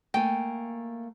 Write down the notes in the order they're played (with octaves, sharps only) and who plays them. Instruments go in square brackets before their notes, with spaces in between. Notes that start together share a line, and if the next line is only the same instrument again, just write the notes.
[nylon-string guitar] A3 A#3 G#5 [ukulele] G5